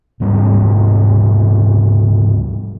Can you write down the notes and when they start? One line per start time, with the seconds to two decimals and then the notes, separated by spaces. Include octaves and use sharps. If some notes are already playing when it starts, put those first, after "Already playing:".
0.20 D1 G#2 G3 C4